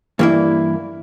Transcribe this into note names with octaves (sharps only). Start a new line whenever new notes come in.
G2 E3 A#3 E4